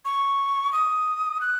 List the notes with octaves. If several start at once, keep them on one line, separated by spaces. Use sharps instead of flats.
C#6
D#6
F#6